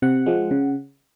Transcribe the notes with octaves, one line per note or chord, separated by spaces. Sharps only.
C3 F#5
F3 G#3
C#3